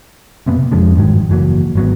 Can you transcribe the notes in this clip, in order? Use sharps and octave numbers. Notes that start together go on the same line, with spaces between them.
F#2 C3 A#3 B3
C3
F2 F3 G#3 D4
G1 G#2 D#3 F#3
F#1 E3 F#3 A#3
G#1 F#3 B3